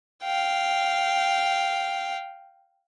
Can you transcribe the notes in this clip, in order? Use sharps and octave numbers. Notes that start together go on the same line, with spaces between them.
F5 G5